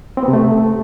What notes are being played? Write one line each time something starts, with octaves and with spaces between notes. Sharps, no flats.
C4
B3
C3
A3